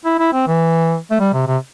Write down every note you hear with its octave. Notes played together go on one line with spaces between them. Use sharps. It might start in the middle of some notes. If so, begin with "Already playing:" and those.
E4
E4
C4
E3
A3
G3
C3
C3